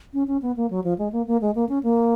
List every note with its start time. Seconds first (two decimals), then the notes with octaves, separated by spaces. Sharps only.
0.13 C#4
0.27 C#4
0.42 B3
0.57 A#3
0.70 F#3
0.84 F3
0.99 G#3
1.13 A#3
1.27 A#3
1.41 G#3
1.55 A#3
1.69 C#4
1.83 A#3